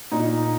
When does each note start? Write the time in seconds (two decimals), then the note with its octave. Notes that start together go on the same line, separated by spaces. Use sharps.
0.11 A#2 D#4